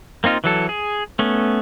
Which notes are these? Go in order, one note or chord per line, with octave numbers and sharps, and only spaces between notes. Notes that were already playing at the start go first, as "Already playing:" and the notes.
A#3 C4 D#4 F4
E3 F#3 A4
G#4
A3 B3 C#4